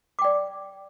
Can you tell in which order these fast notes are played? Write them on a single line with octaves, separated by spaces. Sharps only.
D6 G5 D5